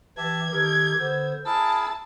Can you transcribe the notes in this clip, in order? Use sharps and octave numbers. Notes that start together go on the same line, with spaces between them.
E3 G4 E5 A5 G#6
D#3 D#4 G4 A4 A#4
D3 B3 C5 E6
E4 G#4 A#4 A5 E6